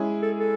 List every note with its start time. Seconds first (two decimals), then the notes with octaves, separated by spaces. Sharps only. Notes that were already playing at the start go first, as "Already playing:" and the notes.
Already playing: G#3 C#4 E4 G#4
0.22 A4
0.39 A4